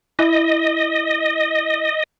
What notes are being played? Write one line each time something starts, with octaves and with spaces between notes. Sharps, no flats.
E4 D#5